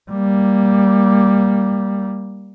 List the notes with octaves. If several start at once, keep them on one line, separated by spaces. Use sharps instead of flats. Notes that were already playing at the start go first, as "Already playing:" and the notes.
G3 A#3